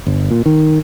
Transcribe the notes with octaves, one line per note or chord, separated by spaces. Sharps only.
G1
A#2
D#3